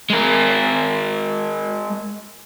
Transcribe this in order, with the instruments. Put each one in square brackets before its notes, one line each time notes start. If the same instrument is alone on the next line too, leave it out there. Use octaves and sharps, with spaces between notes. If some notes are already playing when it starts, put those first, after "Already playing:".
[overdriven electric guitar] G#3 A#4